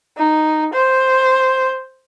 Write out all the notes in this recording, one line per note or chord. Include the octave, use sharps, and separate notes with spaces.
D#4
C5